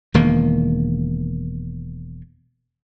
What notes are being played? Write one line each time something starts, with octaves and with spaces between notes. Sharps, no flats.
E1 D#3 A#3